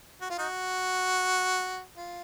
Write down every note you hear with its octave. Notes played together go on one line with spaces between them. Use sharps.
F#4
F4
D#4 F#4
F4